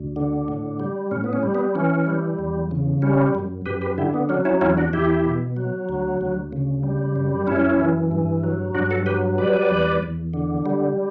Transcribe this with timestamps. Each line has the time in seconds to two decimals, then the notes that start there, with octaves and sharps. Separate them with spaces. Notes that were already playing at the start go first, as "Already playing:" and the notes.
Already playing: D2
0.16 D3
0.48 A2
0.80 G3
1.11 A2 C#4
1.24 B3
1.33 C#4
1.43 G3
1.55 B3
1.75 E3 C#4
2.07 G3
2.39 E2
2.71 C#3
3.02 G3 C#4
3.35 F#2
3.66 F#2 G4 B4
3.81 G4 B4
3.98 D3 E4 G4
4.14 B3
4.29 F#3 C#4
4.45 C#4 E4
4.61 E2 C#4 E4
4.77 D4 F#4
4.93 E2 E4 G4
5.25 B2
5.57 F#3
5.89 D2
6.21 D2
6.53 C#3
6.83 G3
7.16 F#2
7.47 F#2 C#4 E4
7.80 E3
8.11 G2
8.44 F#3
8.75 G2 D4 F#4
8.90 F#4 A4
9.06 F#3 G4 B4
9.38 G3 B4 D5
9.70 E2
10.03 E2
10.34 D3
10.66 G3